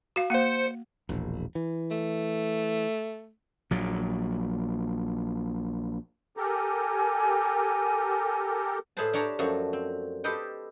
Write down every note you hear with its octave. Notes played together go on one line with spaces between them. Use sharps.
F#4 F5
A#3 C5 F5 C#7
E1 A#1
E3
A3
A#1 A#2 F#3
G4 A4 A#4 G#5
A2 E4 G#4 B4 C5 A5
D4 G4 C#5 A5 A#5 C6
F#2 F3 A3 F#4
C4
G4 A4 B4 C5 D#5 G5